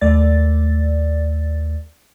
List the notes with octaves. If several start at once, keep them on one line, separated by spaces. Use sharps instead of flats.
D#2 A3 D5 A6